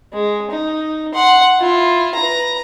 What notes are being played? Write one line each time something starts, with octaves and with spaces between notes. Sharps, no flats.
G#3
D#4
F#5 C6
E4 F4
B4 A#5